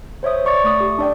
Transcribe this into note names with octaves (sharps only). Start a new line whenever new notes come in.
C5 C#5 E5 D#6
D5 C#6 D6 A6
A3 C#6 D#6
G4
D4 D5 G5